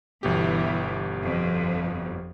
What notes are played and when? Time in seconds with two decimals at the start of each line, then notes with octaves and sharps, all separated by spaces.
0.23 G1 B2 E3 G4
1.22 F2